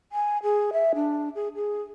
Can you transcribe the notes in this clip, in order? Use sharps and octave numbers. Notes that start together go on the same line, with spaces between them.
G#5
G#4
E5
D4
G#4
G#4